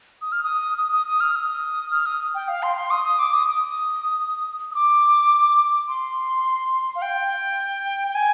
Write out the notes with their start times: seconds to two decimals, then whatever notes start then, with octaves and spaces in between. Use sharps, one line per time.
0.22 D#6
0.32 F6
0.43 D#6
0.78 D#6
0.92 D#6
1.07 D#6
1.20 F6
1.36 D#6
1.91 F6
2.06 D#6
2.35 G5
2.48 F5
2.63 C6
2.77 C6
2.91 D#6
3.05 D#6
3.19 D6
3.34 D#6
3.48 D#6
4.71 D#6
4.75 D6
5.88 C6
6.95 F5
7.02 G5
8.08 G5
8.15 G#5